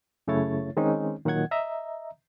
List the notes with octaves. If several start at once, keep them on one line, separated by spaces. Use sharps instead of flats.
F#2 C#3 A3 E4 C#5 A6
D#3 G#3 C4 C#4 D#4
A#2 D#3 F#3 F#5 G#6
D#5 E5 A#5